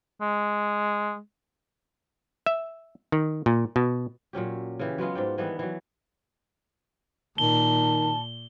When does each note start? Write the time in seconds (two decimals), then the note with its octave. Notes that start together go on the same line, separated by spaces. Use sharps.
0.21 G#3
2.46 E5
3.12 D#3
3.46 A#2
3.76 B2
4.33 A#2 F#3 C#4 G4
4.80 C#3 E3 G4
4.98 F#3 G#3 B3 F4
5.15 G#2 D5 G5
5.38 D#3 E3 G3 B3
5.59 E3 F#3
7.38 A#2 D#3 A5 G7